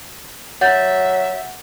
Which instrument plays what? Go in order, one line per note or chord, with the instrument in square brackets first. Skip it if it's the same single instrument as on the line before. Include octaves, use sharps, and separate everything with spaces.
[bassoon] F#3 [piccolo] E5 [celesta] F#5 G6 A6